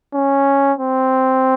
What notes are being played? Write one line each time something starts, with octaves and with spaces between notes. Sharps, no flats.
C#4
C4